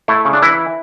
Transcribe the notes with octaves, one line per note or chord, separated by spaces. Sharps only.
A3 E4
C#3
D4
E3 E4